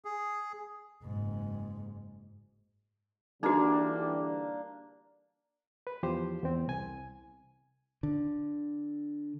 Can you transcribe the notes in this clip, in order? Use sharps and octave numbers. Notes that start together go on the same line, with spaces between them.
G#4
F#1 G#2
D3 E3 G3 A#3 D4 D#4 F#4
B4
E2 F3 G4 C5
E2 C4
C2 G#5
D3